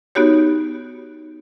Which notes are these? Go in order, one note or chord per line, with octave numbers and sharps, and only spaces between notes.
B3 D#4 F#4 G4 C#5